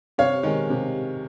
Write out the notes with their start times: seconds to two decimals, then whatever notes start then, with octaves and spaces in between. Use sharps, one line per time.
0.18 C3 C#5 F5
0.43 D#3 G#3
0.70 C3